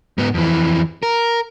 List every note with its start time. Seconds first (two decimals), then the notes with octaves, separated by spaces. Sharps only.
0.18 G#2 B3
0.34 F2 E3
1.03 A#4